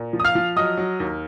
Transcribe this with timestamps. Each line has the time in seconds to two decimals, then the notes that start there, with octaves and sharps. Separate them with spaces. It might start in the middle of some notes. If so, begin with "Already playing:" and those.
Already playing: A#2
0.13 F3
0.20 D#6
0.24 F5 F6
0.35 F3
0.56 F#3 D#5 D#6
0.77 F#3
1.00 D#2